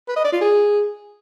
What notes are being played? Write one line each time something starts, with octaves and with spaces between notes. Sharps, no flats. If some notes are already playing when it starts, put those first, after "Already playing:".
B4
D#5
D5
F4
G#4